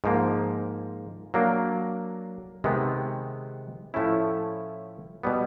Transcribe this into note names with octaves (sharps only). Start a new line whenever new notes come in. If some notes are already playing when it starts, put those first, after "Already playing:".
G#2 F3 A#3
F#3 A#3 D4
C3 D#3 G#3 B3
A2 F3 A3 C#4 E4
B2 G3 B3